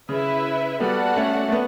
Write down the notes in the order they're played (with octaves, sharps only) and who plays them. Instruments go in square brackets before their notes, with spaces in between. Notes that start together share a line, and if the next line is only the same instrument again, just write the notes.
[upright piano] C#3 [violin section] E4 B4 E5
[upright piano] G3 B3 [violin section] F#4 A4 D5 F#5 A5
[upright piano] A3 C#4
A3
B3